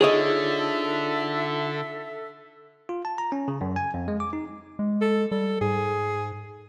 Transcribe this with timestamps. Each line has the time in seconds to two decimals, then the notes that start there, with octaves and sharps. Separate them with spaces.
0.01 D3 D#4 F4 G#4 A4 C#5 D#5 E5
2.89 F4
3.05 A5
3.18 A#5
3.32 C#4
3.48 C#3
3.61 F#2
3.76 G#5
3.94 F2
4.08 G#3
4.20 D6
4.33 D#4
4.79 G#3
5.01 A4
5.31 G3 A4
5.61 G#2 G#4